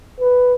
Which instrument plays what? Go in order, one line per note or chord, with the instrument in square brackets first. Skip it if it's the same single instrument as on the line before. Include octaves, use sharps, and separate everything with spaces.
[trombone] B4